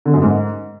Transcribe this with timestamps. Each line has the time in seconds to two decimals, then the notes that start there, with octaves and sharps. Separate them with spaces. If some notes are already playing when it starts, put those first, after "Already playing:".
0.06 D3
0.14 F#2
0.22 G#2